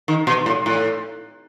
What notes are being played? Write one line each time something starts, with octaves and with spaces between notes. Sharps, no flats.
D#3
B2
A2
A2